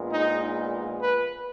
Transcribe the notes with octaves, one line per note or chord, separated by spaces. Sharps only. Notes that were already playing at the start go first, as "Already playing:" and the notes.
Already playing: A#1 A#2 G#3 B3
D#4
B4